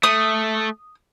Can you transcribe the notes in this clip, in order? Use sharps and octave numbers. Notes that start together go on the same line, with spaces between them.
A3 D#6